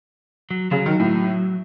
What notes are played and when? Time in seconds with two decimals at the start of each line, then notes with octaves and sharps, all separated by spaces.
0.51 F#3
0.71 C#3 F#3
0.86 D#3
1.00 A2